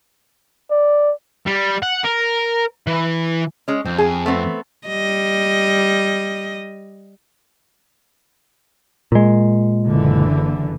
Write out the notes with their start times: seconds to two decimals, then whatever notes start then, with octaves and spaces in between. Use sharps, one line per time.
0.70 D5
1.46 G3
1.82 F#5
2.04 A#4
2.87 E3
3.68 G#3 C#4
3.85 F2 C4
3.98 G#4
4.26 A3 B3 C4
4.88 G3 D#5
9.12 A#2 G#3
9.86 F#1 D3 E3